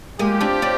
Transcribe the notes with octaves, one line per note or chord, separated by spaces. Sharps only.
G#3 A#3 F4 G4
C4 D4
C4 D4